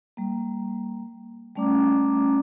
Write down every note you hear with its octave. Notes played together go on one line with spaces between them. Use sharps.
G3 A#3
G3 A3 C#4 D5 A#5 D6